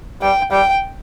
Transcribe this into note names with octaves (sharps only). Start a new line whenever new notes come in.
G3 G5
G3 G5